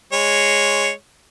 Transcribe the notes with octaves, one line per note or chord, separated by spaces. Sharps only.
G#3 C#5